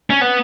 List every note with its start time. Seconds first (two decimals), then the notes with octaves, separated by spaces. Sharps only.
0.10 C#4
0.21 B3